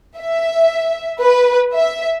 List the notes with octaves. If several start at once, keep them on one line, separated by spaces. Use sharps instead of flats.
E5
B4
E5